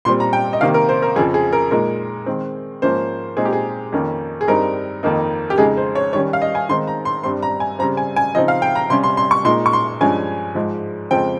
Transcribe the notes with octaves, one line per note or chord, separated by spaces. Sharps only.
A#2 G3 C4 C6
A#5
G5
D#5
C3 D#3 A#3 F5
A#4
C5
A#4
F2 C#3 F3 C4 G#4
G#4
A#4
A#2 G#3 D#4 A#4
D#3 G#3 C4
G#2 F3 A#3 C#4 C5
A#2 G#3 C4 D#4 G#4
G4
G#4
F2 D#3 A#3 C#4
G#4
G2 G3 C4 D#4 A#4
F2 D#3 A#3 D#4
G4
F2 C#3 G#3 D#4 G#4
C5
C#5
D#3 G3 C#4 C#5
F5
D#5
G#5
D#3 G#3 C4 D#4 C6
A#5
C6
G2 G3 C4 C6
A#5
G#5
C#3 G3 C4 A#5
G#5
G#5
C#3 F3 C4 D#4 D#5
F5
G5
A#5
C3 G3 C#4 C6
C6
C6
C#6
A#2 G#3 D#4 C6
C#6
C6
G2 F3 G#3 C#4 G#5
G#2 F3 G#3
F2 C#3 F3 G#3 C4 G5